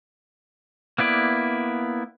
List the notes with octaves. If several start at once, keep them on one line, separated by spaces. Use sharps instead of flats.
A#3 B3 E4 D5